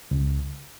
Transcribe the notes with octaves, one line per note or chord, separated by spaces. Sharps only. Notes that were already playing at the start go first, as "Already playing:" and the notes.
C#2